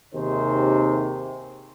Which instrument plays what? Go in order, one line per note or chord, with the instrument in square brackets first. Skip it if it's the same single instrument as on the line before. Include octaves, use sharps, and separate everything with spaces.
[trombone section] D#2 C3 D#3 G#4 C5